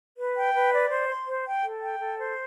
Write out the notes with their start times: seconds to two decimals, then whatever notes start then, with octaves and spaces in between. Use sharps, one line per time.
0.18 B4
0.36 G5
0.54 B4
0.72 D5
0.91 C5
1.09 C6
1.27 C5
1.46 G5
1.63 A4
1.81 G5
2.00 A4
2.18 C5